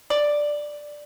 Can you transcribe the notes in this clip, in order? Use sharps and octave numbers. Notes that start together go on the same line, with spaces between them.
D5